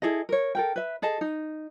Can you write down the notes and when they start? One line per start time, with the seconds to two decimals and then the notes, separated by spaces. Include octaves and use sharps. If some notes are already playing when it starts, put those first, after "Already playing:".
0.02 E4 G#4 A4 D#5
0.29 A#4 C#5
0.55 A4 A#4 G5
0.76 B4 E5
1.02 G#4 A4 D#5 A5
1.21 D#4